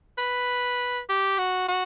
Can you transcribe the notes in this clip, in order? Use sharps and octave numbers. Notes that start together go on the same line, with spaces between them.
B4
G4
F#4
F#4